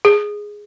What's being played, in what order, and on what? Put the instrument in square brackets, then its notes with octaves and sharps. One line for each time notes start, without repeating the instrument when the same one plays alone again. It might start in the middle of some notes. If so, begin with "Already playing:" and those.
[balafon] G#4